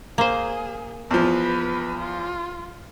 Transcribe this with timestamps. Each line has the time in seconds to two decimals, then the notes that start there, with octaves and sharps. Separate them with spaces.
0.18 A#3 G#4 C5
1.11 E2 F3 B4
1.98 F4